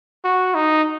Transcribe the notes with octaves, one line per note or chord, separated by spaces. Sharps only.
F#4
D#4